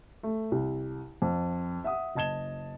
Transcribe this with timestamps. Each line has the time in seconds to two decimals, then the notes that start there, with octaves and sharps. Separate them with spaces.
0.23 A3
0.52 C2
1.22 F2
1.84 E5 F#5 D#6
2.15 F#1 D#5 A5 G#6 E7 G7